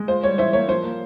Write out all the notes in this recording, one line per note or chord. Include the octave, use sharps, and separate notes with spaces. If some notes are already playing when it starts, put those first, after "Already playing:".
Already playing: G#3
F4 C5
G3 C#5
E3 C5 E5
A#3 C#5
F3 C5
A#3